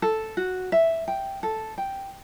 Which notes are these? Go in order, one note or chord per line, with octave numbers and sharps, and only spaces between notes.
A4
F#4
E5
G5
A4
G5